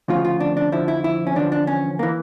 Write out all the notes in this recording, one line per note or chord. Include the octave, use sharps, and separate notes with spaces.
D2 C#3 F3 F4
F4
D4
D4
F2 D3 F3 E4
E4
E4
C#4
E2 D3 F3 D4
D4
C#4
E3 A#3